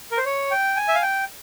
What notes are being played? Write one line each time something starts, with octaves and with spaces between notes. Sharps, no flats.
A#4
C5
C#5
G5
G#5
E5
F5
G5